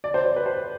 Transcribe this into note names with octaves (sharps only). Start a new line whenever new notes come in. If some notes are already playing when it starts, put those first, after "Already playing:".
D5
C5
C5
B4
C5